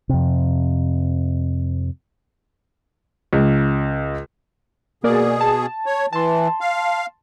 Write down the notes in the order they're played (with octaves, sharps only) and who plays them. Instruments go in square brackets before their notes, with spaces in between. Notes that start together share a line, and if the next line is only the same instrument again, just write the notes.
[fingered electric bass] F2 C3
[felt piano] C#2
[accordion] B2 G#4 [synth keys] A#3 A#4 D5
[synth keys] A5
[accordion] C#5
[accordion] E3 [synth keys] A5 C6
[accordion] F5